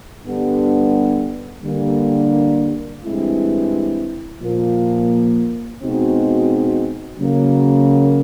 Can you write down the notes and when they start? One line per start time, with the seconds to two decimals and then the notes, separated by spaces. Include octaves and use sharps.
0.24 G2 D3 G3 B3 D4
1.63 D3 G3 A#3
3.02 G2 E3 G#3 C4 E4
4.41 A#2 F3 A#3
5.80 B2 G#3 C4 D#4 F#4
7.19 C#3 F#3 A#3